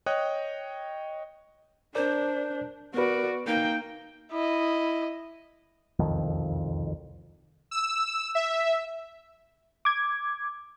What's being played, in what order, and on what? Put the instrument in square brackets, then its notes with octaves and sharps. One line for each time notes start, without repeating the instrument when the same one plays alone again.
[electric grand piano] C#5 D#5 G5 D#6 F#6
[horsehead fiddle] D4 [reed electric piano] A#4 D5 [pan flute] C5
[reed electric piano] B3 B4 [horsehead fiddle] F#4 D5 [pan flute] A#4
[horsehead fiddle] A#3 G5 [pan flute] D#4
[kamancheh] E4 D#5
[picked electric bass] E1 C2 F2 D#3
[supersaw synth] E6
E5
[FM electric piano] D6 G#6